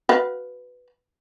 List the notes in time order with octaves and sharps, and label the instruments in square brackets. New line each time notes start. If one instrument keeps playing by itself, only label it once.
[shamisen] F#4 B4 F5